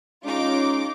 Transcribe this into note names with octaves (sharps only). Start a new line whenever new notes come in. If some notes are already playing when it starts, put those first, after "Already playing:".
G#3 C#4 D#4 F4 D6